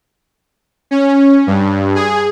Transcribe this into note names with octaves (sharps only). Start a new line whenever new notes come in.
C#4
G2
G#4